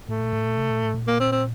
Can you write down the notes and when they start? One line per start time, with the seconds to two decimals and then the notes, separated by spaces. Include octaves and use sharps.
0.08 A2 A3
0.21 A#2
0.33 A2
0.45 A#2
0.57 C3
0.70 A#2
0.83 A2
0.94 A#2
1.07 A#3
1.20 C4
1.32 C4